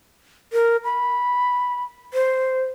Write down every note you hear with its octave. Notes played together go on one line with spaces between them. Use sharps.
A#4
B5
C5